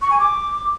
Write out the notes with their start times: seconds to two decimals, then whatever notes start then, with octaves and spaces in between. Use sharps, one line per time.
0.02 C#6
0.10 G#5
0.19 D6